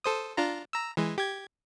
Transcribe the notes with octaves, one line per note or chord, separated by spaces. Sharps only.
A4 C5 D#6
D4 F4 A#5
A#5 E6
E3 G#3
G4 G#6